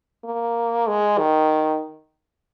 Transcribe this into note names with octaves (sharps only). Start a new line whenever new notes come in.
A#3
G#3
D#3